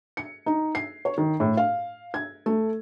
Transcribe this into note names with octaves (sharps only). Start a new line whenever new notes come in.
C#7
D#4
C7
C#5
D#3
A2
F5
G#6
A3